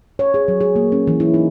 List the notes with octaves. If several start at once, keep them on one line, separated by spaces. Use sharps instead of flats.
C#5
G#4
F#3
G#4
A#3
C#4
E3
E4
D#4